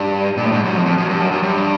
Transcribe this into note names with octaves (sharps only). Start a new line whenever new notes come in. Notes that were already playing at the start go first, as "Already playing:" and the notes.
Already playing: G2
A#2
A2
G#2
F#2
F2
F2
F#2
G2
F#2
F#2
G2